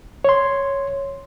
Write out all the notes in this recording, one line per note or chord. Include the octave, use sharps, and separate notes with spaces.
C#5 C6